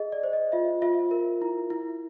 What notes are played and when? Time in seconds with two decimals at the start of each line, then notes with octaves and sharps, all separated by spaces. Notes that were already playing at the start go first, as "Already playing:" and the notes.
Already playing: G#4 D#5
0.12 D5
0.23 C5
0.33 D#5
0.52 F4 E5
0.82 F4 E5
1.11 A#4
1.42 E4
1.70 E4